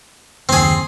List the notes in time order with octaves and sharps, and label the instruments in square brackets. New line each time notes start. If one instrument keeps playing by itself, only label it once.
[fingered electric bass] F#1 D#2 [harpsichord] C4 G#4